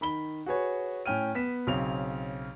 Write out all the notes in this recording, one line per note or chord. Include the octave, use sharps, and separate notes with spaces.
D#3 B5 G7
F#4 G#4 B4 C#5
A2 C#4 G5 F6 D#7
B3 B6 E7
B1 C#3 C4 F7